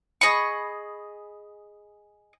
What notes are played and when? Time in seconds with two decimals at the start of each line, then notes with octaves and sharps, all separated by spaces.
0.21 G#4 D#5 B5 C#6